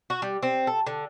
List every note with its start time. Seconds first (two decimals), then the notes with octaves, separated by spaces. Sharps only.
0.10 F#4
0.22 G3
0.43 C4
0.67 A4
0.86 D3